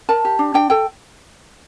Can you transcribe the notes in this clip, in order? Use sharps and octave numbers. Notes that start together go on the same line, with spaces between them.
A#4 A5
G4
D4
D4 G5
A4 G5